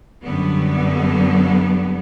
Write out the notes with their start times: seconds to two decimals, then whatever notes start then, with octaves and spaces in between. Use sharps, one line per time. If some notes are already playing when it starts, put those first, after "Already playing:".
0.23 F#2 D3 G3 B3